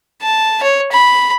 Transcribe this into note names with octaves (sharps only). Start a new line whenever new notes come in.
A5
C#5
B5